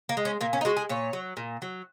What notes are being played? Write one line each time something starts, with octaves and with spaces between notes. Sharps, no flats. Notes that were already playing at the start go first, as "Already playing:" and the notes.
A#3
G#3
C#4
A#2 A#3
C#4
D#4
G#3 F#4
G#4
A#2 C#5
F#3
A#2
F#3